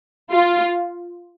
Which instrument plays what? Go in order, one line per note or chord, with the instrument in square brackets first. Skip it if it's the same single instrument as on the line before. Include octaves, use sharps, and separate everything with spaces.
[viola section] F4